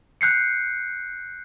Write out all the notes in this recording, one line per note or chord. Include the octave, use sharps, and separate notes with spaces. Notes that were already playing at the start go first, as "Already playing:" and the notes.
F#6 G6 C7 C#7